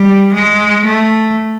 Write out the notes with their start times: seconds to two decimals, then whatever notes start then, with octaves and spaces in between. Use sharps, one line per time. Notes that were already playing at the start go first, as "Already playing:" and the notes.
Already playing: G3
0.34 G#3
0.86 A3